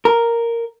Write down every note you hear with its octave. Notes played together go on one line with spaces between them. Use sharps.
A#4